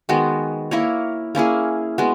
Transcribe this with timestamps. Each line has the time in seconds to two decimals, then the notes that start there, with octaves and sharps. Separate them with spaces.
0.09 D#3 G#3 B3 F#4
0.71 A#3 E4 A#4 C#5
1.35 A#3 C#4 E4 G#4
1.98 G#3 B3 F#4